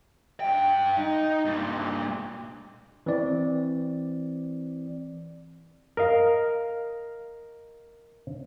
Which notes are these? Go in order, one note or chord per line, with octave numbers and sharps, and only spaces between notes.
G2 G5
D#4
G2 A#2
E3 C4 D5
A#4 D#5 F5